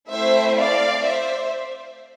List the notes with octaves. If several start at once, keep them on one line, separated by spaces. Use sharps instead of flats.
A3 C4 E4 C5 E5
D5 F5
C5 E5